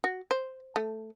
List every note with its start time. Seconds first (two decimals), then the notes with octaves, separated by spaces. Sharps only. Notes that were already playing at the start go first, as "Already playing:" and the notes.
0.04 F#4
0.31 C5
0.76 A3